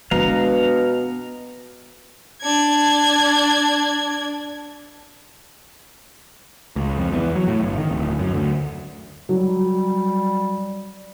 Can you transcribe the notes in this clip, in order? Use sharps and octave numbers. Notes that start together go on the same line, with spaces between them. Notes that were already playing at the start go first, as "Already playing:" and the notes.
B2 G#3 B3 D4 F5 A#5
D4 G#6
C#2
F2
E2
F#3
A2
G1
D#3
D1
F#2
D2
F#3 G3